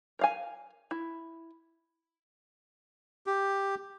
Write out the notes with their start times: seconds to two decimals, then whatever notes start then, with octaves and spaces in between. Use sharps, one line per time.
0.19 A#4 F5 G#5
0.91 E4
3.27 G4